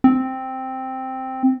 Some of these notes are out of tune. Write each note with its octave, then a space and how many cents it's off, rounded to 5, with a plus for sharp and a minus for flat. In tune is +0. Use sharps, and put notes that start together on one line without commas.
C4 +0